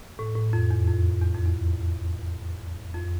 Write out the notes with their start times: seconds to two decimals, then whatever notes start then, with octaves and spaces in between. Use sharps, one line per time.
0.19 A2
0.36 A2
0.53 F2
0.71 E2
0.88 F2
1.22 E2
1.35 F2
1.46 E2
2.94 F2